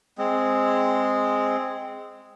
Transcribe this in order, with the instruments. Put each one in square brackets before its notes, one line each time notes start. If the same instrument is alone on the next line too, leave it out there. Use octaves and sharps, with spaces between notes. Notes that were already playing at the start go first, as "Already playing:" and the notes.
[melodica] G#3 C4